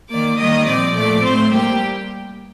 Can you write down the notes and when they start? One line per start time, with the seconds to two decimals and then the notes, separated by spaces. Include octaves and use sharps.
0.08 D#3 A#3 D5 D6
0.37 D#3 G3 A#3 D#5 D#6
0.65 A#2 F3 C4 D5 D6
0.94 A#2 F3 A3 D5 D6
1.23 A2 A3 C4 C5 C6
1.51 G3 A#3 G4 G5